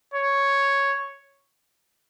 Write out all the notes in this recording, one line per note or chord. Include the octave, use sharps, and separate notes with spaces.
C#5